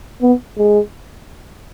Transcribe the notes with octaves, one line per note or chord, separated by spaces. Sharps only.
B3
G#3